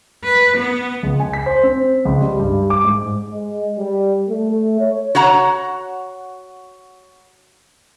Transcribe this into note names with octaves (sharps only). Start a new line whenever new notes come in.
B4
B3
C#2
G#5
B6
C5
C4
C#2
G3
G2
D6
G#2
G#3
G3
A3
C#5
F#4 C#5 F#5 A#5